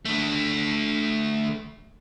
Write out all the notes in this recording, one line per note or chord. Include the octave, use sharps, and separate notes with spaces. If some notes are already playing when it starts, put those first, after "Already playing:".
D3 A3